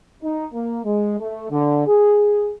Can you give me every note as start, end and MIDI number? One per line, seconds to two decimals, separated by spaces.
0.23 0.47 63
0.53 0.80 58
0.85 1.20 56
1.20 1.49 57
1.50 1.86 50
1.87 2.52 68